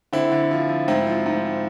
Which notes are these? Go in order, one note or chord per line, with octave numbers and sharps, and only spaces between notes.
D3 C4 E4
D3
F3
F3
G#2 C4 E4
F3
G#2